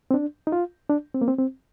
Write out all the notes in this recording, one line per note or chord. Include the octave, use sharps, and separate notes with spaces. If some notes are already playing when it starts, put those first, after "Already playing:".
C4
D4
D#4
F4
D4
C4
A#3
C4
C4